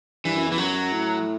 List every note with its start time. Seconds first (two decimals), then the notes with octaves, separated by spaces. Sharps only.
0.25 G2 E3
0.36 F#2
0.47 E2 E3
0.58 F#2 F#3
0.92 A2